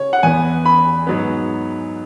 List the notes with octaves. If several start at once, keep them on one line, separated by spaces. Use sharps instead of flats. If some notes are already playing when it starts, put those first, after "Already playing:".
Already playing: C#3 C#5
F#5
E2 E3 B3 G#5
B5
G#2 F#3 B3